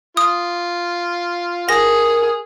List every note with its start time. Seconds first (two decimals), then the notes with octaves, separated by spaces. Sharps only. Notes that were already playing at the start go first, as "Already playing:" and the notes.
0.17 F4 D#6
1.69 G#4 A#4 A#6